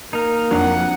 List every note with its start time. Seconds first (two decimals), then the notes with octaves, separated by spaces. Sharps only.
0.13 A#3 D#4 A#4
0.51 F2 F#3 D4 F5 F#5